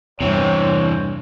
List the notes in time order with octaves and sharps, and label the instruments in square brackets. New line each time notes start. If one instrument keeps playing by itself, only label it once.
[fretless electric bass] E2 G2 [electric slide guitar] C3 E3 C4 [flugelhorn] C#5